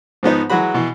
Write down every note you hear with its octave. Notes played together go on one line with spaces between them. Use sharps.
G#2 F3 B3 D#4
E3 F#3 G#3 F#4 B5
B2 E3